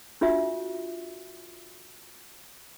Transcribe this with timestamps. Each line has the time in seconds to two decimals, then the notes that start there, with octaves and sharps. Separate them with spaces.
0.21 D4 F4 F#4 E5